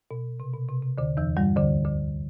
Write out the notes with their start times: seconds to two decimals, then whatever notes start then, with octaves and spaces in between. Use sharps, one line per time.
0.11 B2
0.40 C3
0.53 B2
0.69 C3
0.83 C3
0.98 D2 D3
1.17 E2 E3
1.37 G2 G3
1.56 D2 D3
1.85 D2 D3